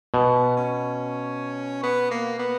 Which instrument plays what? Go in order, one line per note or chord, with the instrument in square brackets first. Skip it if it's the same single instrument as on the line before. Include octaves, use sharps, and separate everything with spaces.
[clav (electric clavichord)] B2 [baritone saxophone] B3
[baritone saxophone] C#4
B3
A#3
B3